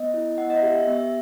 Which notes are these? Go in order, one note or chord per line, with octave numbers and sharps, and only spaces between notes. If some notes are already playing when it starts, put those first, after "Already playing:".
Already playing: B3 D#5
E4
B3 F#5
D#5
E5
G4
E5
B3
E5